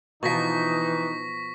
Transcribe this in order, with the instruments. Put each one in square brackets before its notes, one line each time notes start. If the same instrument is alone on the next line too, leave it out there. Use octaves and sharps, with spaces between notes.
[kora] B2 F3 [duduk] E3 [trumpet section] D#4 [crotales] C#6 A#6 B6